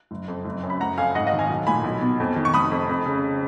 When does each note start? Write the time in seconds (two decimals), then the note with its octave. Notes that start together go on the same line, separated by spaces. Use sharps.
0.11 F#1
0.28 F2
0.45 F#1
0.63 F#2
0.70 B5
0.81 F#1 F#5 A#5
0.98 F2 F5 G#5
1.15 G#2 D#5 F#5
1.27 D#5 F#5
1.33 D#3
1.39 F5 G#5
1.49 B1
1.67 A#2 G#5 B5
1.84 B1
2.01 B2
2.20 F2
2.36 D#3
2.45 C#6
2.54 F1 B5 D#6
2.72 F2
2.89 F2
3.06 C#3